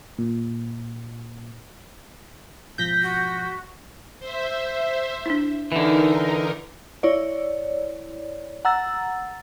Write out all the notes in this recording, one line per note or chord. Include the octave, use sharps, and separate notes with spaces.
A#2
G#2 B2 F3 G6 A#6 B6
F#4
C5 E5
D4 E4
D3 E3 D#4 A#4
E4 C#5 D5
F#5 A#5 E6 A6